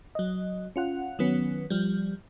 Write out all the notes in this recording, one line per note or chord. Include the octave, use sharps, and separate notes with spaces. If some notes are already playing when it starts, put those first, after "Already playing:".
F#3 D#5
C#4 F4 F#5
D#3 F#3 B3 C#4
F3 G3